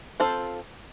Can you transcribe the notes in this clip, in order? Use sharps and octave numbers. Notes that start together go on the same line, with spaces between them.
C4 F4 A4 C5